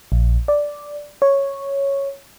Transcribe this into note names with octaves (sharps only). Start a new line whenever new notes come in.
A#1
D5
C#5